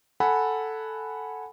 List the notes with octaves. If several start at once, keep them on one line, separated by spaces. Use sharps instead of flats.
A4 F#5 G#5 B5